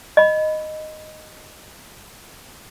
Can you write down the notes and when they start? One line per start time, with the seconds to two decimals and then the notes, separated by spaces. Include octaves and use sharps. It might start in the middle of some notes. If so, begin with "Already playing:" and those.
0.17 D#5 B5